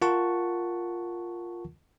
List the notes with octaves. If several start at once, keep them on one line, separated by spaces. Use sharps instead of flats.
F4 A#4 F#5 A5 C#6